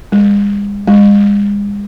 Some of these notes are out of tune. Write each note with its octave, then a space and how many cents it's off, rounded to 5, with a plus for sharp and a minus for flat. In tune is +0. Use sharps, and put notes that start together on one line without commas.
G#3 -45
G#3 -40